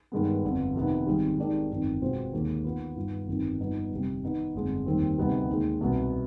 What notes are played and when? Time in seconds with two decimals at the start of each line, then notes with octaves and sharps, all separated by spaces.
0.12 G2 D#3 G#3 B3
0.44 G1 F2 D3
0.75 F1 F2 C3 D#3 B3
1.07 G#1 G#2 G3
1.39 D#3 G#3 D4 G4 D5
1.71 G1 F2 D#3
2.02 B2 G#3 C4 F4 C5
2.33 D#2 D3 G#3
2.65 D#3 B3 F4 B4
2.96 G2 D#3 B3 F4
3.27 G1 F2 D#3 G3
3.59 G2 F3 B3 D#4
3.91 G1 F2 C3 G3
4.23 D#3 B3 D#4
4.54 G1 F2 D3 G#3
4.86 F1 D#2 D#3 G3 C4
5.18 D2 C3 G3 B3 D#4
5.49 D#2 D#3 G#3
5.81 C2 B2 B3